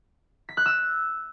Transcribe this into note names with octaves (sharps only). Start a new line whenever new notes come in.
B6
F#6
E6